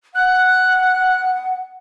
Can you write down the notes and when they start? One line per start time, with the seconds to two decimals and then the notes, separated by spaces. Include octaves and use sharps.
0.15 F#5 F#6